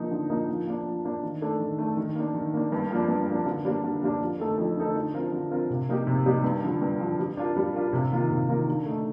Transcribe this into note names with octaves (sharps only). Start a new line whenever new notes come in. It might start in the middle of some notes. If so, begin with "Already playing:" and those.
Already playing: D3 F3 A#3 D#4
D3
F3 A#3 D#4
F3
A#3 D4
F3
A#3 D4
D#3
A3 D4 A4
D#3
A3 D4 A4
D#3
A#3 D4
D#3
A#3 D4
G2
F3 A#3 D4
G2
F3 A#3 D4
D3
G3 A#3 D4
D3
G3 A#3 D4
F2
D3 A3 D#4 A4
F2
D3 A3 D#4 A4
D3
F3 C4 F4 A#4
D3
F3 C4 F4 A#4
C3
G3 A#3 D#4 G4
C3
G3 A#3 D#4 G4
G2
D3 F3
G2
D3 F3
G3
D4 F4 A#4
G3
D4 F4 A#4
C3
D#3 A#3 F4 A#4
C3
D#3 A#3 F4 A#4
D3
A3 D#4